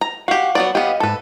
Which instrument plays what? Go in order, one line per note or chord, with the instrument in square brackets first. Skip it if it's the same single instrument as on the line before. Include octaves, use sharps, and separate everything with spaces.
[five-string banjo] A#5
[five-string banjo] F#4 G4 [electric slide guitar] F5 F#5
[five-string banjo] F#3 B3 D5
[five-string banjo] B3 G4 [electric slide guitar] D#5 F5
[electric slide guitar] G#2 A5 [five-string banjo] A4 B4